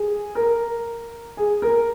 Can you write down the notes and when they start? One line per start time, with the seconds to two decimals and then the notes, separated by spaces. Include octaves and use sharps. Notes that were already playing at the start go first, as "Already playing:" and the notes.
Already playing: G#4
0.35 A#4
1.37 G#4
1.62 A#4